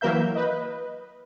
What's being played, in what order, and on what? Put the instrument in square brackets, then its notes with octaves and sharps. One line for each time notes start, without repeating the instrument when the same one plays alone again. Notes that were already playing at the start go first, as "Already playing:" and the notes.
[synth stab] E3 F#3 A#3 A#4 E5 G6
B4 D#5